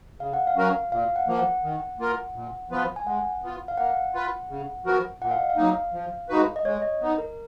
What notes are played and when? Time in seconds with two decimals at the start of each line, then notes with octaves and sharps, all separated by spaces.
0.20 C#3 F5
0.33 F#5
0.47 F5
0.56 F#3 C#4 F#4 A#4
0.92 A#2 F5
1.16 F#5
1.28 F3 A#3
1.39 F#5
1.64 D#3
1.99 A#3 F4 A#4
2.35 A#2
2.71 F3 B3 F4 B4
2.96 G#5
3.06 G#3 F#5
3.43 B3 F4
3.68 F5
3.78 A#3 F#5
4.14 F4 B4
4.49 C#3
4.86 F3 B3 F#4 A#4
5.22 A#2 F#5
5.31 F5
5.40 D#5
5.50 F5
5.57 F#3 A#3 D#4
5.93 F3
6.29 G#3 D#4 F#4 B4
6.56 D#5
6.65 G#3 C#5
6.82 D#5
7.01 B3 D#4
7.18 A#4